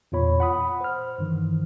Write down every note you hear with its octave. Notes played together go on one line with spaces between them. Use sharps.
E2 A#2 F4 C#5 B5
F#5 B5 D#6
C5 F6
G2 D#3 E3